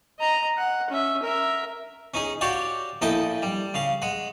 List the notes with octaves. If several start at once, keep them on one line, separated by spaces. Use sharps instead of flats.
D#5 A#5
F#5
C#4 E5
A#4 E5
C#4 D#4 G#4
F#4 G4 C#5 D5 F5 G5
A#1 E4 A4 D#5 G5 A5
G3
C#3 F5
G#3 F#5